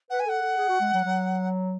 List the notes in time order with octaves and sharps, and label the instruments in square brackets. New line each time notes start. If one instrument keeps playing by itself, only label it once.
[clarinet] B4 [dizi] F#5
[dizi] G#5
[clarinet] A4 [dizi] F#5
[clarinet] A4
G#4
F#4
G#3
F#3
F#3